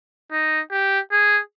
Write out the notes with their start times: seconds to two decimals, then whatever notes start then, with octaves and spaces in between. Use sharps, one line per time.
0.32 D#4
0.72 G4
1.12 G#4